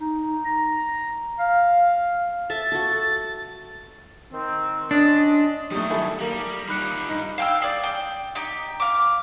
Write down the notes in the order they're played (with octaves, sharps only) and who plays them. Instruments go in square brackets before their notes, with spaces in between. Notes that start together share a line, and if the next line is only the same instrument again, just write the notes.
[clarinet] D#4
A#5
F5
[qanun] A4 E5 [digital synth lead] A6
[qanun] F#4 A4
[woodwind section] D#3 C4
[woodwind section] C#4 C5 D#5 [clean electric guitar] D4
[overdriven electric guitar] D#3 F#3 [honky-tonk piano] G3 A3 [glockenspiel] D#6
[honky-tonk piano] E4 A4
[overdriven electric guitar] G3 [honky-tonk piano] A#3 A#4
[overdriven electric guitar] D#3 G3 [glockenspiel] B5 F#6 C#7
[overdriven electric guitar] G2 [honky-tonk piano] D#4
[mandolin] F5 G5 E6
G#4 D5
G5
D#4 G4
F5 D6